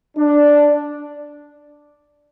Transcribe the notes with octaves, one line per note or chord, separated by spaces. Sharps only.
D4